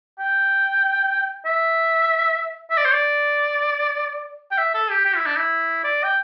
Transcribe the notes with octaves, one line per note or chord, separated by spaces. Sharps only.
G5
E5
E5
D5
C5
D5
G5
E5
A4
G4
G4
E4
D4
E4
D5
G5